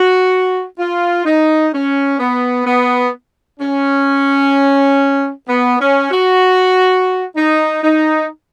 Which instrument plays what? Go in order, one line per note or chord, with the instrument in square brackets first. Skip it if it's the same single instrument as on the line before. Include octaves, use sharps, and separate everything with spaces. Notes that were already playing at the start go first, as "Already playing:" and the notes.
Already playing: [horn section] F#4
F4
D#4
C#4
B3
B3
C#4
B3
C#4
F#4
D#4
D#4